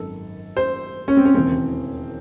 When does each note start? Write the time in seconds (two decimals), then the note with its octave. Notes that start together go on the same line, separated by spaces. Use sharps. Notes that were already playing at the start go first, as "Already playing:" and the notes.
Already playing: G#1 F#2 D#3 A4
0.57 C5
1.08 C#4
1.17 C4
1.25 C#4
1.34 E1 D#2 C#3 E3 C4